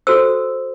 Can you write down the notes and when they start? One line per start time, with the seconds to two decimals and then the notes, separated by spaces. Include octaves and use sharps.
0.07 F#4 A4 C5 E6